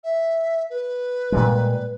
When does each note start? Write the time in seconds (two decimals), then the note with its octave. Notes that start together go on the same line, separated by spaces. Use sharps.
0.04 E5
0.70 B4
1.32 A#2 G3 G#3